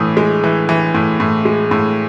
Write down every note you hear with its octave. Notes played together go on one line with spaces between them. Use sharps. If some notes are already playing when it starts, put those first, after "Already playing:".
Already playing: A2 E3 D#6
G#3
E3
E3
A2
A2
G#3
A2